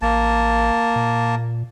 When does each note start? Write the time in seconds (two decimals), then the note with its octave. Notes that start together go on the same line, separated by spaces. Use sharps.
0.02 A1 A#3 A5
0.96 A#2